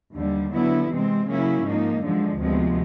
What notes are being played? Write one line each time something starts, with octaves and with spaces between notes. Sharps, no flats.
D#2 D3 G3
D3 F#3 B3 E4
C3 E3 G#3 C4
C#3 F#3 A#3 C#4 E4
G#2 F3 A#3 D#4
F#2 D3 F3 G#3
D2 C3 F3 G#3 B3